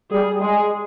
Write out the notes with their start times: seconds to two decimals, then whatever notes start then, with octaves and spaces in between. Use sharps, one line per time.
0.11 G3 G#4
0.41 G#3 G#4